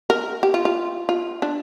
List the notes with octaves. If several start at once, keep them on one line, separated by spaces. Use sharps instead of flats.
A#4
G4
F4
F4
F4
D4